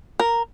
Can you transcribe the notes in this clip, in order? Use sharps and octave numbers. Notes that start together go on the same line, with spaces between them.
A#4